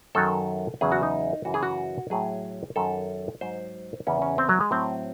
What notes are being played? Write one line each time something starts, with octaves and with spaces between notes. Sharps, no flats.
F#2 D#3 F#3 A4
E2 C#3 F#3 G#4
F#4
D#4
F#2 C#3 E3 F#4
G#4
F#4
A2 F#3 G#4
F#2 D#3 F#3 A4
G#2 F#3 C5
E2 C#3 E3 C#4
C#4
C4
F#3
G#3
A2 F#3 C4